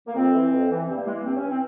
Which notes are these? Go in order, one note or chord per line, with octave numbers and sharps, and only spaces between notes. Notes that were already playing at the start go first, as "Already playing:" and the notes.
A#3
F2 C4
E3
F2
E3
G2 C4
A#3
E3 G#3
A#3
G2 C4
C#4
E3
C4